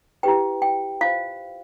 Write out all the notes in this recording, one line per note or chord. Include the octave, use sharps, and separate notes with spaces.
E4 G4 B4 G5
G5
F4 C5 F5